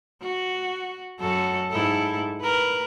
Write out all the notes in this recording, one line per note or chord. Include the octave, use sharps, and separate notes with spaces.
F#4
F#2 F#4 A4
G#2 E4 A4
A#4 B4